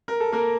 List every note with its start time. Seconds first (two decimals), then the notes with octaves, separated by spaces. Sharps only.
0.08 A#4
0.20 A4
0.33 A#3 A#4